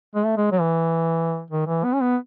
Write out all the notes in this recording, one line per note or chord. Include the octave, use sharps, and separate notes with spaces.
G#3
A3
G#3
F#3
E3
D#3
E3
B3
C#4
B3